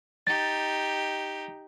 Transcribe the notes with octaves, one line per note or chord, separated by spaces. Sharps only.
D#4 G4 A6